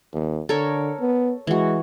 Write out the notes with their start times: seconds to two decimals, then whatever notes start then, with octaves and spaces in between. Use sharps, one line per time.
0.13 D#2
0.49 D3 A4 A#4 C#5
1.00 B3
1.47 E3 G#3 F#4